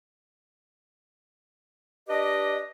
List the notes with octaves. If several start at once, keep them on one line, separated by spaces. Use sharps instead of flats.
D4 G4 B4 D#5